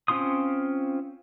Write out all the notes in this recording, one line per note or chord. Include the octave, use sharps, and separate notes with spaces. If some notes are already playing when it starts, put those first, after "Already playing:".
C4 C#4 F4 C6 D#6